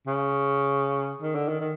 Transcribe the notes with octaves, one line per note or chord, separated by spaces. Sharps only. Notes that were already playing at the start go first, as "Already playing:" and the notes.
C#3
D#3
D3
D#3
D#3